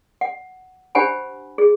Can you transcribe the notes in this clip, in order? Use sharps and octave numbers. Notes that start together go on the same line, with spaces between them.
F#5
D4 G4 C5 F#5 G#5 B5
G#4